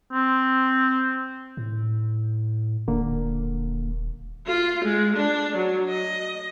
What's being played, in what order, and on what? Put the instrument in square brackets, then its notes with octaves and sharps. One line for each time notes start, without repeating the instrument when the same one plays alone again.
[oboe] C4
[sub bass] A2
[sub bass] D#1 [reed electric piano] D3 A#3
[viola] F4
G#3
D4
F#3
D#5